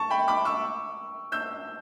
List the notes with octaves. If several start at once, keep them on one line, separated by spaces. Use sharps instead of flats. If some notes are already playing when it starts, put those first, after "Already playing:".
Already playing: A5 C#6
G5 B5
B5 D6
C#6 E6
E6 G6